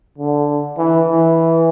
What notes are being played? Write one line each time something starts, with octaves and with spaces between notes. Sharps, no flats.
D3
E3
E3